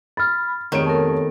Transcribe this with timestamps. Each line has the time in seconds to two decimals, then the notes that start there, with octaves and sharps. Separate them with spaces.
0.17 B5 F6 A6
0.72 F1 D#3 G#4 C#5 D7
0.86 B3 A4 A#4 A5